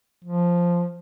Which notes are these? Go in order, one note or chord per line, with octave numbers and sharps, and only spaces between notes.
F3